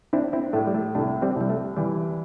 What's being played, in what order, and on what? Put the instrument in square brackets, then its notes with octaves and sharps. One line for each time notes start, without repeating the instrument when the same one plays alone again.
[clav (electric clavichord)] C4 E4 [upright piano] D4
[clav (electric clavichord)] C4 E4
[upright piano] A2 [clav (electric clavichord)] A3
[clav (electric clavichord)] G3
A3
[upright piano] C2 [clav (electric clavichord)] A3 D4
[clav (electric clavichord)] G3 C4
[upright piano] C2 [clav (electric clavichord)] G3
[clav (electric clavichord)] A3
[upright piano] E3 [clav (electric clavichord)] G3